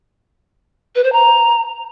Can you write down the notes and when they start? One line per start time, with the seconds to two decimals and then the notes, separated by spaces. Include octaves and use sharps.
0.95 B4
1.04 C5
1.12 A#5